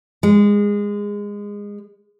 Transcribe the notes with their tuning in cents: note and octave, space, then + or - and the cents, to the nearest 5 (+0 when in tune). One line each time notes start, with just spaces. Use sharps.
G#3 -20